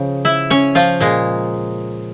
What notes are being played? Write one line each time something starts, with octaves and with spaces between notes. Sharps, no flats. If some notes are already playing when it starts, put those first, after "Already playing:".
Already playing: C#3 F3
E4 E5
C#4 C#5
F3 F4
A#2 G#3